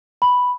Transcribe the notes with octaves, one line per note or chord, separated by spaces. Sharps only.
B5